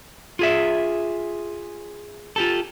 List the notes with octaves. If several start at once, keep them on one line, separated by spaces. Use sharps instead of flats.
F4 G#4 E5
F4 G4 A4